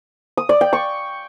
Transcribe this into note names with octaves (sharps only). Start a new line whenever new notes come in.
D#6
D5
G5
C#6